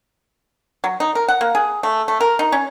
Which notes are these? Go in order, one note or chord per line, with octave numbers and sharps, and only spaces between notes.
F#3
D#4
A#4
F#5
A#3
G#4
A3
A3
A#4
D#4
C#4